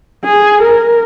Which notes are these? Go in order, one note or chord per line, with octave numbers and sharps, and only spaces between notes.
G#4
A#4